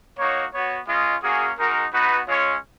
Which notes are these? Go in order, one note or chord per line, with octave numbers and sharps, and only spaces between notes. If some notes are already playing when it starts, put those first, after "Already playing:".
A#3 D#4 F#4 C#5
B3 F#4 C#5
G#3 C#4 F4 D#5
A#3 C#4 F#4 G#4
G#3 D#4 F#4 A#4
B3 D#4 F#4 B4
G#3 C#4 F4 C#5